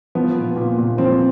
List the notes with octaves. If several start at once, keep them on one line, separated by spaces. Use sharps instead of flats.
F3 B3
A#2
A#2
A#2
F3 C4